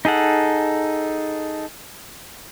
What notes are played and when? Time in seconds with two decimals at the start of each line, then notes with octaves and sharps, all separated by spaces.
0.05 D#4 G#4 A4 F#5